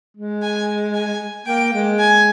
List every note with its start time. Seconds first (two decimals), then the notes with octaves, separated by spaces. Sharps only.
0.17 G#3
0.43 G#5
0.95 G#5
1.46 A#3 G5
1.73 G#3
1.99 G#5